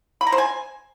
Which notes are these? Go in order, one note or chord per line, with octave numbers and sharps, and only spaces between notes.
B5
A#5
C5
G#5